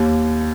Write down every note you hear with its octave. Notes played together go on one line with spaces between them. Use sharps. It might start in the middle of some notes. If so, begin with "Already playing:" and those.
Already playing: D#2